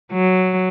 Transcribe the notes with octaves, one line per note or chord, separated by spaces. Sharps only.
F#3